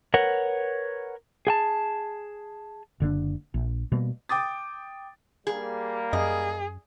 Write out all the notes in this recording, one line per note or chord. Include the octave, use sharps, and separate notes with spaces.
A#4 B4 C#5 F#5
G#4 G5 A5
F#1 D3 A#3 D4
A#1
B2 G3 A#3
G5 D6 D#6 A6
G3 A#3 G#4
F#2 G#4 D#5